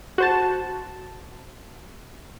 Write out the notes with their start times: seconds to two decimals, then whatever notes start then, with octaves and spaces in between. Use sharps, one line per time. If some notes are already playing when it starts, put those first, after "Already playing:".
0.18 F#4 C5 A5